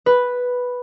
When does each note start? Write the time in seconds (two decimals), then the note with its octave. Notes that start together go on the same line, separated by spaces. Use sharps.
0.06 B4